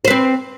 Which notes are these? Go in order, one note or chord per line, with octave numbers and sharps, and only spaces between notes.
C4 B4 C5